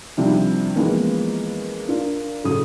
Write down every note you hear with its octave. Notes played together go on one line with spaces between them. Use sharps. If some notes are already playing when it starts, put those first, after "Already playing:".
C3 D#3 F3 G3 D4 E4
E3 F3 G#3 A#3 B3 C#4
D4 F4 A#4
A2 C#3 F#3 D#6